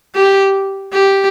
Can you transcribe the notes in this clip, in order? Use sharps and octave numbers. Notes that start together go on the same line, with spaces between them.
G4
G4